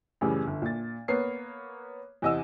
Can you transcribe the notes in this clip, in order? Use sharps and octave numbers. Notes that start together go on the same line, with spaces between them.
F#2 A2 C#3 E3 G3
G1
A#2 A6
A#3 B3 B4 C#5 C7
E2 C3 D#5 F#5 E6